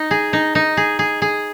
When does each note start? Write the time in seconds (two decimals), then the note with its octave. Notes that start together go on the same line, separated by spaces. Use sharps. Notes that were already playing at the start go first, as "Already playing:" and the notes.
Already playing: D#4
0.11 G#4
0.33 D#4
0.55 D#4
0.77 G#4
0.99 G#4
1.22 G#4